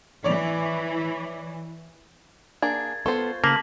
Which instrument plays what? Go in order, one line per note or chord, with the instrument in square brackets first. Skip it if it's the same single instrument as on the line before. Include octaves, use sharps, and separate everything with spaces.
[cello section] E3 [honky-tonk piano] C#5 D5 F7
[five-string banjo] A#3 D4 G#4 [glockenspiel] G#6 A6
[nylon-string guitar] B3 A4 [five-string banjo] F4 C5 [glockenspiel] C#6
[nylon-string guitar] C#3 [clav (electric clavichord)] A#3 [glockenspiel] A5 B6 F#7